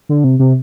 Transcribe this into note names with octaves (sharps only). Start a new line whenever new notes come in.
D3
C3
C3